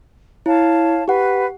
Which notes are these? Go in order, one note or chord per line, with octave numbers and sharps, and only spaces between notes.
E4 C#5 F5 A5
G4 B4 F#5